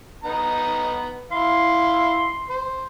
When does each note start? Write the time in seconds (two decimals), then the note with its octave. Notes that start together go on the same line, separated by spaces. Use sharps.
0.24 B3 D#4 A#5
1.32 E4 F5 C6
2.50 C5